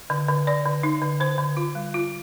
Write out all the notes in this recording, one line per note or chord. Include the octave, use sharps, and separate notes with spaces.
D3
D3
D3 D5
D3
D#4
D3
D3 C5
D3
F4
G3
F4